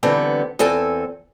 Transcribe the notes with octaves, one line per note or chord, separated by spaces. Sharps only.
D3 E3 G3 B3 C4
E2 C4 A4 G#5